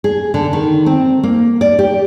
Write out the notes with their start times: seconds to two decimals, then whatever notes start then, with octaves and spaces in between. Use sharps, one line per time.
0.04 G#4
0.34 D3
0.53 D#3
0.86 C4
1.24 A#3
1.61 D5
1.79 G4